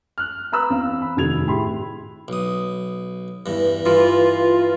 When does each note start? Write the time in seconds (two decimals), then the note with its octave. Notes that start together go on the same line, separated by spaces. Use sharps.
0.18 F6 F#6
0.52 B4 A#5 B5 E6 F#6
0.70 E2 C4 F5
1.02 B5
1.16 F1 D#3 F#4 G#4 G#6 F7
1.47 A2 G4 B5 C6
2.28 B1 D#6
3.46 E2 G2
3.86 G2 E3 F4